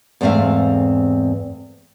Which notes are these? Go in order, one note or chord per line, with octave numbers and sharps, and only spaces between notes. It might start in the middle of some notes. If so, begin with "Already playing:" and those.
E2 G#2 A3 C4 E5 F5